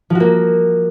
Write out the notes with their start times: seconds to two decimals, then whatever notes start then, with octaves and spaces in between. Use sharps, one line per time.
0.10 F3
0.15 F#4
0.20 A#3